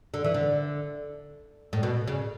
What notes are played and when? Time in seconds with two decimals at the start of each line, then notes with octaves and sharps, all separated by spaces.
0.14 D3
0.24 E3
0.34 D3
1.73 A2
1.83 B2
2.08 C#3